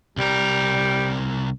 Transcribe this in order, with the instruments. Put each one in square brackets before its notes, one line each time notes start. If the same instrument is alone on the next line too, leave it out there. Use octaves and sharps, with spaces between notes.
[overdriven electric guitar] C2 A#4 [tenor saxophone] G3